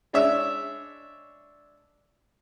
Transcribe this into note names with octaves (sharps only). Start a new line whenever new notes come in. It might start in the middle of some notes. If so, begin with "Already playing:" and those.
G#3 D4 C#5 D5 E5